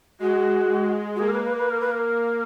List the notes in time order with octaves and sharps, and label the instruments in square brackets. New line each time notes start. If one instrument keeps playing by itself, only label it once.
[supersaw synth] G#3 [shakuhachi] F#4
[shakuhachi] F#4
[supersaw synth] A#3 [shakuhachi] G#4
[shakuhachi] A#4
B4
B4
B4
A#4
B4
A#4